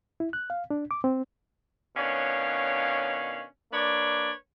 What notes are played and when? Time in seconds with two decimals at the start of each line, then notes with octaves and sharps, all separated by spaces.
0.20 E4
0.33 F#6
0.50 F5
0.70 D4
0.91 D6
1.04 C4
1.97 B2 D#3 C#4 D4 C#5 F5
3.72 A#3 D4 B4 C#5 D5